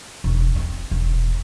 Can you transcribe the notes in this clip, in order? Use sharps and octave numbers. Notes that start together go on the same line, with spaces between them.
E1
C4
E1